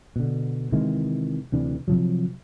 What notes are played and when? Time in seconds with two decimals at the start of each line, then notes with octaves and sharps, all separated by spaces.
0.16 B2 D3
0.72 C3 D#3 E3 G#3
1.52 D2 C3 E3 D4
1.88 C3 F3 F#3